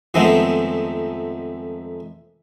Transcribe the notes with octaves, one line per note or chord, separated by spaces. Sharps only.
F2 D#3 G#3 A3 B3 C4